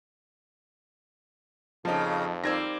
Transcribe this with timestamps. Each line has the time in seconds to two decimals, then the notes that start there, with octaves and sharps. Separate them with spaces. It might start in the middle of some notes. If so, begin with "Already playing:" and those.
1.85 F2 C#3 F3 A#3 D#4 A5
2.44 G3 A#3 C4 D#4 E6 G#6 A#6